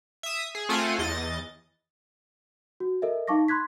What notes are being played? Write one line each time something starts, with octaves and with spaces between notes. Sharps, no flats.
E5 D#6
G#4
A3 C4 F4 A4 F#5 G#5
E2 D#5 A6
F#4
A4 A#4 D#5 E5
D#4 F5 A5 C#6 D6 A#6
B5 C6 F#6 G#6 B6